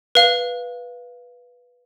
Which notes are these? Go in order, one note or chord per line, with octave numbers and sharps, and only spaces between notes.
B4 F5